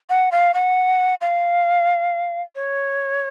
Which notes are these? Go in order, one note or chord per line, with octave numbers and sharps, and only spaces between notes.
F#5
F5
F#5
F5
C#5